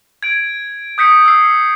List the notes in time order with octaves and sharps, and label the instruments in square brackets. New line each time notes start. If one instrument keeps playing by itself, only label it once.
[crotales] G#6 D7
D#6 G6 B6 C#7
E6 C7